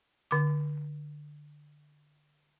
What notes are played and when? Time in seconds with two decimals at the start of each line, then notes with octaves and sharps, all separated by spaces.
0.31 D3 D6